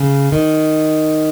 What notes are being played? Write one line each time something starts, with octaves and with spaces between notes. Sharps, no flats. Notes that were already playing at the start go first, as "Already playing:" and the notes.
Already playing: C#3
D#3